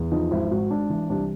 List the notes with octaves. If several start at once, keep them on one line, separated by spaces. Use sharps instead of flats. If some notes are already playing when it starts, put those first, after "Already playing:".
Already playing: E2
F3 D#4
G#1 E4
G#2 F#4
G#1 D4
E3
C2 D4